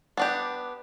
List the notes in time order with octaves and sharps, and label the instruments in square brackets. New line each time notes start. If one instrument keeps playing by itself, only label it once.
[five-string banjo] B3 D4 G4